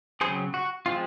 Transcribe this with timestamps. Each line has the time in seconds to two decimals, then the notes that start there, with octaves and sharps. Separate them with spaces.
0.21 C#3 F#3 C4 G#4 C5
0.54 F#4
0.86 F3 G#3 C4 F4